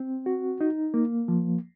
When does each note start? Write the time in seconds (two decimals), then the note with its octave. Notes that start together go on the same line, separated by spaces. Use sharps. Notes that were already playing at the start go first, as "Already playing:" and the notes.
Already playing: C4
0.26 F#4
0.61 D#4
0.94 A#3
1.28 F3